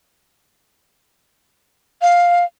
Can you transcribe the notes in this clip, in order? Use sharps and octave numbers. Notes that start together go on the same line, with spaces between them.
F5